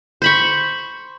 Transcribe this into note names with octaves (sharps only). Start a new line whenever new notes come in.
C5 B5 C#6